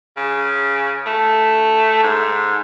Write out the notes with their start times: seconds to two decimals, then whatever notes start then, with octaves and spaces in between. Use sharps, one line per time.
0.17 C#3
1.06 A3
2.03 G#2